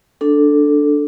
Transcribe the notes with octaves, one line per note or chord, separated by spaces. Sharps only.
D4 A4